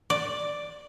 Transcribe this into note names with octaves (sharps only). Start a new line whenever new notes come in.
D5